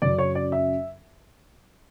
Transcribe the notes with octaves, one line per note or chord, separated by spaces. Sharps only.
F#2 C#3 F#3 D5
C#5
D5
E5